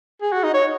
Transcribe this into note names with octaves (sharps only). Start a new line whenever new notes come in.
G#4
F#4
D#4
C#5